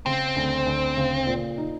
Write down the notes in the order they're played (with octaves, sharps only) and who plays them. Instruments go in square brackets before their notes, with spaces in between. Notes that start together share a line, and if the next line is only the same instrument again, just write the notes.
[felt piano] C#3 [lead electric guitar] C4
[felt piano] D2
D2
C#3
A#2
D#4